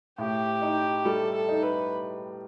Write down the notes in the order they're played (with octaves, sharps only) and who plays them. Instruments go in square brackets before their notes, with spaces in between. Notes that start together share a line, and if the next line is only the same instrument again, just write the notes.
[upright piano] A2 [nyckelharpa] G4
[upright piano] D#4
[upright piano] G3 [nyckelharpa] A4
[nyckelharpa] A4
[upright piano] D#4
[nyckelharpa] B4